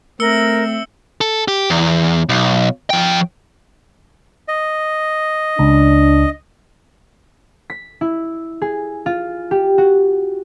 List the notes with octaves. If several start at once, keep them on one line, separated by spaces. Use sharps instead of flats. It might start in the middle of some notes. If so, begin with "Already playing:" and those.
A3 C4 A#4 E5 E6 C#7 G7
A4
G4
E2
B1
F3 G5
D#5
C#2 D4
B6
E4
G#4
F4
G4
F#4